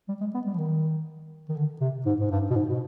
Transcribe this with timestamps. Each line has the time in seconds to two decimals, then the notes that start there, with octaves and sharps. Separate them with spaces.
0.09 G3
0.21 G#3
0.34 B3
0.46 G3
0.54 F3
0.58 D#3
1.49 D#3
1.56 D3
1.81 C3
2.06 G#2
2.20 G#2
2.31 G2
2.51 B2
2.56 G#2
2.68 B2